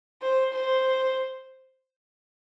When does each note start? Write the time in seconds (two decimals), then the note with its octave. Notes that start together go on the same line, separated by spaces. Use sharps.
0.22 C5
0.52 C5